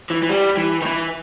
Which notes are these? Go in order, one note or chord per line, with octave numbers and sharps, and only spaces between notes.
E3
E3
G3
E3
D#3
E3